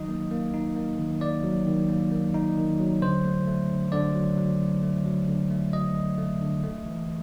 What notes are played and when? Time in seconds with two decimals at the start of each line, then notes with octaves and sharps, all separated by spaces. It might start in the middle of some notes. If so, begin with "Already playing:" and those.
Already playing: D#3 F#3 D#4 D#5
0.08 A#3
0.31 A#3
0.54 D#4
0.76 A#3
0.99 D#3
1.21 A#3 D5
1.44 F#3
1.67 D#3
1.89 A#3
2.12 A#3
2.34 D#4
2.57 D#3
2.80 F#3
3.02 D3 C5
3.25 A3
3.47 A3
3.70 D3
3.92 D3 D5
4.15 F#3
4.38 F#3
4.61 F#3
4.83 A3
5.05 F#3
5.28 D3
5.51 A3
5.73 F#3 D#5
5.96 F#3
6.18 A3
6.41 D3
6.64 A3
6.86 E3